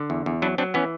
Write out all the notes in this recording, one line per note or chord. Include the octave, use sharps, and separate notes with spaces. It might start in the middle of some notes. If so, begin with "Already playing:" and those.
Already playing: D3
E2
E2
F#3 D4 E4
F#3 C4 D4
E3 B3 C#4